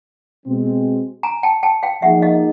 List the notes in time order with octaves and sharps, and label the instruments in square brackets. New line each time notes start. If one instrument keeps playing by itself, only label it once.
[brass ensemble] B2 G#3 C4
[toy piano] G#5 A#5
G5 A5
G5 A5
F5 G5
[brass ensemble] F3 A#3 D#4 G#4 [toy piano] E5 F#5
[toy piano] D#5 F5